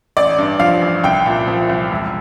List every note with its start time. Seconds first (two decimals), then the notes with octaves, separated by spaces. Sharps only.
0.17 A1 D5
0.38 G2
0.59 F3 F5
0.82 A1
1.04 C2 G5
1.26 A#2
1.48 F3
1.69 C2
1.91 E1